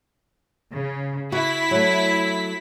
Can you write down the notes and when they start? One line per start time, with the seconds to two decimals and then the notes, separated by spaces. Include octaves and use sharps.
0.76 C#3
1.32 E4 F#4 B6
1.71 F#3 A3